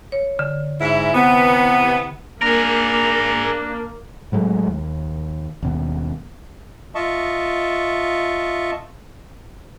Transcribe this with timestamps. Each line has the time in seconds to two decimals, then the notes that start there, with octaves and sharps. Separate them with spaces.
0.12 C#5
0.39 D3
0.80 G#2 E4
1.13 C3 E3 B3
2.42 A#3 D4 G#4 A#4
4.32 A2 F#3 G#3 A3
4.68 D#2
5.63 D#2 B2
6.95 F4 D#5 E5 A5 C#6